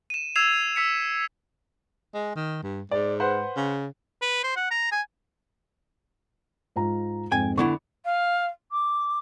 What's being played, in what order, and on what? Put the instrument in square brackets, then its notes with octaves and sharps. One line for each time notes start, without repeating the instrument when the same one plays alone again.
[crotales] D#7 E7
E6 G#6 C7 E7 F7
E6 B6 C#7
[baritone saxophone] G#3
D#3
G2
[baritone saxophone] G#2 [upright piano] D5
[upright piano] B4 C5 F#5
[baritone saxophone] C#3
[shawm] B4
C5
F#5
A#5
G#5
[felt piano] G#2 F4 A#5
[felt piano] F2 G#2 [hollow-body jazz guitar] G5 G#5
[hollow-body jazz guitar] D3 B3 E4 [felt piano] C#6
[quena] F5
D6